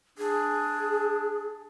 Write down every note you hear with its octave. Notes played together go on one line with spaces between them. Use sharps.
D4 G#4